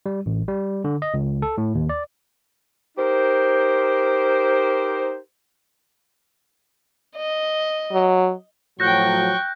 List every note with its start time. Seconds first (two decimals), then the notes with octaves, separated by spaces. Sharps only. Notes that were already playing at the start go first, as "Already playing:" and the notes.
0.06 G3
0.26 A1
0.48 G3
0.84 D3
1.02 D#5
1.14 C#2
1.42 A4
1.58 A2
1.75 D#2
1.89 D5
2.98 D#4 G4 A#4 C5
7.16 D#5
7.93 F#3
8.80 A2 F3 F#3 G5 C#6 F#6 G6 A#6